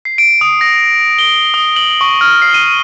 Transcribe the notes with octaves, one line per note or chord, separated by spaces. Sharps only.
C7
D7
D#6
A#6
G7
D#6
F#7
C#6
F6
C7
D#7